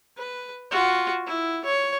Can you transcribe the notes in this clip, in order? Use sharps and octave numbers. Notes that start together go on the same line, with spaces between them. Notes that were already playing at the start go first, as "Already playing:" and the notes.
B4
F4 F#4
E4
C#5